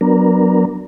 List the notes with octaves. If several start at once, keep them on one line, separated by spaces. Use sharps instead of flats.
F#3 B3 D4 A#4